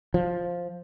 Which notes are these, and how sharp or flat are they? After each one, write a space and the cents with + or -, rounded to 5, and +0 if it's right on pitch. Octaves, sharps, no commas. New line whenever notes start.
F3 +5